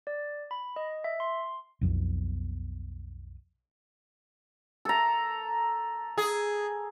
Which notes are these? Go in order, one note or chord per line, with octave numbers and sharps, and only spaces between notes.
D5
B5
D#5
E5
C6
B1 F2 B2
A4 A#5
G#4